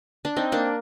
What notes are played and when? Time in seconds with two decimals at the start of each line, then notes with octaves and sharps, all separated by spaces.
0.25 D4
0.36 C4 D#4
0.52 A#3 D4